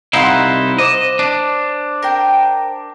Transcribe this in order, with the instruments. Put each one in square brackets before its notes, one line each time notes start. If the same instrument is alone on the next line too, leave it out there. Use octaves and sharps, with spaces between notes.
[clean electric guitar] C2 D#4 E4 [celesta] D#5 [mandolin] F5 F#5 C6
[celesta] C5 D6 E7 [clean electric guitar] D#5
[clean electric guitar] D4
[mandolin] A#4 G5